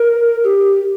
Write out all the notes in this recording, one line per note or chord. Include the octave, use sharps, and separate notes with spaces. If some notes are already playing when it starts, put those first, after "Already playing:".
Already playing: A#4
G4